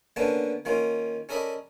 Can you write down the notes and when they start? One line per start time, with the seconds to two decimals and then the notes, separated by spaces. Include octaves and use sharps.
0.16 D3 A#3 B3 C#4 A5
0.65 D#3 A#3 C#4 F4
1.29 C#4 A4 A#4 D5 D#5 B5